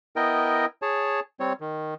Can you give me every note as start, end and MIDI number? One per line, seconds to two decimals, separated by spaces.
0.16 0.66 59
0.16 0.66 64
0.16 0.66 70
0.16 0.66 75
0.16 0.66 79
0.82 1.20 68
0.82 1.20 73
0.82 1.20 81
1.40 1.53 55
1.40 1.53 60
1.40 1.53 73
1.60 1.94 51